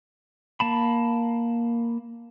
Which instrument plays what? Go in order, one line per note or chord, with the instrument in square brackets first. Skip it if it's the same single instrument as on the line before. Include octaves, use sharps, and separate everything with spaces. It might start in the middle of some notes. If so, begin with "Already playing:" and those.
[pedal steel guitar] A#3 A5 B5